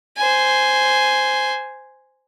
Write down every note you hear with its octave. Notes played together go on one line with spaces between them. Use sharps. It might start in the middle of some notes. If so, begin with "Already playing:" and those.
C5 G#5